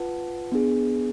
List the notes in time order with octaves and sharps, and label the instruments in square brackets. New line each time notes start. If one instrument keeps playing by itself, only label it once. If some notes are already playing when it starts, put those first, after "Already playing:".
Already playing: [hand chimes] F4 B4 F#5 A5
B3 D4 G#4